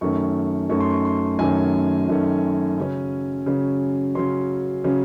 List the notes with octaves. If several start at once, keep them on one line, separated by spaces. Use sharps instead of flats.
F#2 D#3 A3 C#4 C#6
F#2 D#3 A3 C#4 C#6
C6
C#6
C6
F#2 D#3 A3 C#4 G#5
F#2 D#3 A3 C#4
C#3 F#3 C#4
C#3 F#3 C#4
C#3 F#3 C#4 C6
C#3 F#3 C#4